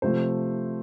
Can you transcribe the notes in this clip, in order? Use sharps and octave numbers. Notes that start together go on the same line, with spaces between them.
C3 F3 A3 C5